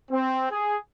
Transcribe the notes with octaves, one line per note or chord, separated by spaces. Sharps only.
C4
G#4